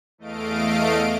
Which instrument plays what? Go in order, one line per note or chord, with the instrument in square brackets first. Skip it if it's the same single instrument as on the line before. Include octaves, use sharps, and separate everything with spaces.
[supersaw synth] E2 A3 D#5 F5 D7